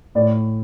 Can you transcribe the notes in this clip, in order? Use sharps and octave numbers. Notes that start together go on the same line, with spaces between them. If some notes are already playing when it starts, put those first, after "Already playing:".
A2 D5